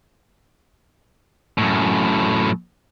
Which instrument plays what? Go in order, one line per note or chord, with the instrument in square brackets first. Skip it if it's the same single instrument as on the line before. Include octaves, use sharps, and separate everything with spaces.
[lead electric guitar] F#2 A2